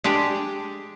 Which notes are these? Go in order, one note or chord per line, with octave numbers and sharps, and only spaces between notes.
G#3 D4 G4 G5